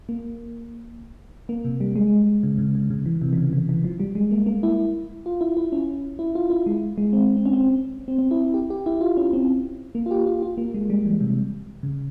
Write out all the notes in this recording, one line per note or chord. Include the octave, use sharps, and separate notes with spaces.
A#3
A#3
C3
G3
G#3
C#3
C#3
C#3
C#3
E3
C3
E3
C#3
E3
E3
F3
G3
G#3
A#3
A#3
E4
F4
E4
E4
C#4
E4
F4
E4
G#3
G#3
C4
C4
C#4
C4
C4
C4
E4
G4
G4
E4
F4
C#4
C4
A#3
F4
G4
F4
F4
A#3
G#3
G3
E3
C3
C#3